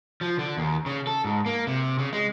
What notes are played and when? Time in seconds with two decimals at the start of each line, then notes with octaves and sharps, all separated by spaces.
0.21 F3
0.39 D3
0.57 D#2
0.86 C#3
1.07 A4
1.24 G#2
1.46 A#3
1.67 C3
1.99 C#3
2.13 G#3